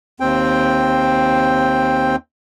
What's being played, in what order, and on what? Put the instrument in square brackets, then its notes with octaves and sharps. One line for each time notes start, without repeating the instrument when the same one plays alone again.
[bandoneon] D#2 C4 G5